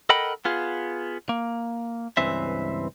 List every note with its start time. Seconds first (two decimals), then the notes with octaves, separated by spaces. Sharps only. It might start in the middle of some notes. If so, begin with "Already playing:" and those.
0.09 A4 A#4 D#5 F#5 G5 B5
0.45 B3 F4 G#4
1.29 A#3
2.17 C#2 G2 E3 C4 E5